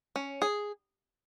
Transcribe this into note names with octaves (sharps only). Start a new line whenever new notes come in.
C#4
G#4